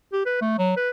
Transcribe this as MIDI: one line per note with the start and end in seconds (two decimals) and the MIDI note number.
0.12 0.23 67
0.26 0.37 71
0.41 0.54 57
0.58 0.72 54
0.76 0.90 71